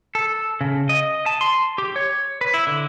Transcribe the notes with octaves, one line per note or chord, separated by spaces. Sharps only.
A4
C#3
D#5
A5
C6
G4
C#5
B4
E4
D3